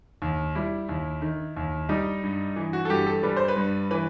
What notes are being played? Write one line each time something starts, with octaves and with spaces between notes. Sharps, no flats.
D#2
G3 E4
D#2
D#3
D#2
G3 D#4
G2
E3
F#4
A4
G2 G4
A4
G3 B4
C5
B4
G2
E3 B4